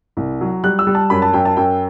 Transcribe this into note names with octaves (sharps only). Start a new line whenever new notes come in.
C2
F#3
G3 F#6
E6
G3
A5
F#2 B5
A5
F#2 G5
A5
F#2 G5